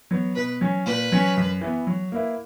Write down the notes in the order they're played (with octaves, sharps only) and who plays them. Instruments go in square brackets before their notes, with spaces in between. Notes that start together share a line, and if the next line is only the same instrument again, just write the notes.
[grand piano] F#3 B3
[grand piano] B2 [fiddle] B4
[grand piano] F#3 C#4
[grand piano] A#2 [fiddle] B4
[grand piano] F#3 C#4
F#2
E3 B3
F#3
A#3 E4 B4